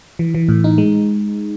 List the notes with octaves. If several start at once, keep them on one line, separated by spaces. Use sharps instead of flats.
E3
E3
A2
D#4
G#3